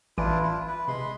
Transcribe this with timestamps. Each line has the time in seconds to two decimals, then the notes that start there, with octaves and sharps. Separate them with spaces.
0.18 A1 E3 D4 E4 F4 D7
0.43 E4 F4
0.68 B4
0.88 C3 G#3 B5 C6